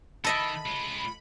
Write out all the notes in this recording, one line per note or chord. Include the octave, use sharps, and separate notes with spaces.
D#3 A4 D#5 E5 B5
G#3 F4